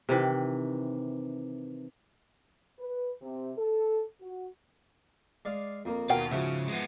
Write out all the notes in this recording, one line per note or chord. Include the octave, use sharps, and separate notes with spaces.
C3 D#3 E3
B4
C3
A4
F#4
G#3 D5 F5
F2 A#3
D#2 B2 F4 A#4 F#5 G5
G#2 C#3 F3 F#4 E5
G#3 B3